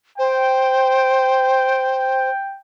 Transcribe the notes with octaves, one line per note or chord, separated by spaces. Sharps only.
C5 G5